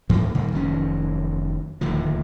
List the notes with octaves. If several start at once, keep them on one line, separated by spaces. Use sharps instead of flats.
G#2 E3 F3 A#3
A2 D#3 G3 A#3
F1 D#3 F#3 C#4
D1 D#2 A2 F3